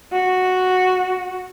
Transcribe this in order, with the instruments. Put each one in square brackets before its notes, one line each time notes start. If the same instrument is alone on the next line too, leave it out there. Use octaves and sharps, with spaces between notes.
[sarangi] F#4